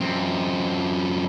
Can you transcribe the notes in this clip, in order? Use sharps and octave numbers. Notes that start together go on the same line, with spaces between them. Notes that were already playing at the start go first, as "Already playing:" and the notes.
F#2 C4